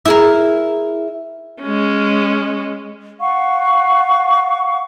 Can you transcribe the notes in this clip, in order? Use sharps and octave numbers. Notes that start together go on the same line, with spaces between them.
E4 G#4 A#4
G#3 C#4
F5 F#5 C#6